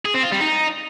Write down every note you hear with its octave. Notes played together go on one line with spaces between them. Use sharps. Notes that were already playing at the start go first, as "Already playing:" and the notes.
G#4
C4
F4
G3
D#4